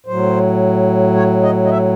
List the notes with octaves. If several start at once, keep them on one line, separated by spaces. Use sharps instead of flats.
A2 F#3 C5
C#5
D#5
D#5
E5